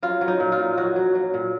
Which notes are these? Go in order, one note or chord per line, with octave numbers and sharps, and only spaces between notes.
F#3 F4
F#3
D#4
A#2
F4
A#2
F#3 F#4
F#3
F#3
A#2